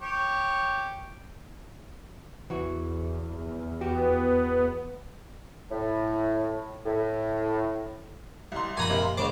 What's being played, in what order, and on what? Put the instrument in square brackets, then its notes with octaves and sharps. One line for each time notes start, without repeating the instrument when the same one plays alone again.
[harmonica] G4 C#5
[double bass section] E2 [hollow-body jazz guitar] E3 F#4
[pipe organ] B3 [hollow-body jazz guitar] F#4 G4
[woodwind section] A2
A2
[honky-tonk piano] C2 C6
[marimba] F#2 A#2 F3 [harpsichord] G#5 A#5 B5
[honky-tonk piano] C3 A#3
C6
[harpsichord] C#2 C#3 D6 [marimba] C5 D#5